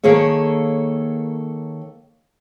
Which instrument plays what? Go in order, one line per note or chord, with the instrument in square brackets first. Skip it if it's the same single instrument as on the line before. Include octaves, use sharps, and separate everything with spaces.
[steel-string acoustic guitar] D#3 A#3 G#4 A4 C#5